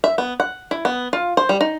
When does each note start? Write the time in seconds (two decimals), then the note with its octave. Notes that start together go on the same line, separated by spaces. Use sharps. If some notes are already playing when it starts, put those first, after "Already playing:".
0.04 E5
0.18 B3
0.40 F#5
0.71 E4
0.85 B3
1.13 F4
1.37 C5
1.49 G3
1.61 D#4